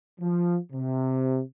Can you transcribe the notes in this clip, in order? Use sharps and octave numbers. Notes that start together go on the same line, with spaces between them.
F3
C3